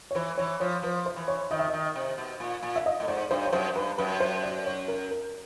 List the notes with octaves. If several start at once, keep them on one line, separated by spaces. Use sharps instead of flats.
C#5
E3 C5
E3 C#5
F3 C#5
F3 B4
C5
E3
C#5
D#3 D#5
E5
D#5
D#3
C3
B2
A#2
A#2
E5
D#5
A2
G#2 D5
G2 C5
C#5
F#2 C5
G2 B4
F#2 B4
C5
D5
C#5
A#4
A#4